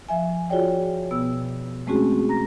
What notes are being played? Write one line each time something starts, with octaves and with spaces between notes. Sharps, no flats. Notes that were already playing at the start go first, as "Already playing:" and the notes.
F3 E5 G#5
F4 F#4 G#4 C#5 D5 G5
B2 B3 E6
G#3 A3 C4 C#4 F#4 G#4
A#5 A#6